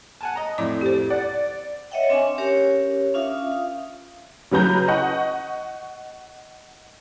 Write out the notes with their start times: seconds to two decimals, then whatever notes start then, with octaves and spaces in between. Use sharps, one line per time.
0.21 F#5 G#5 A5
0.35 D#5 A#5
0.58 F2 A2 D5 D6
0.81 G4 C5
1.10 D5 F#5
1.91 C#5 D#5 E5 F#5 G5
2.10 C4 D4 G#5 C#6
2.38 C#4 G4 A#4 C#5
3.14 C#4 D4 F4 E5 F5 D#6
3.52 F5
4.52 C#3 F#3 B4 A#5 G6
4.88 D#5 F#5 C#6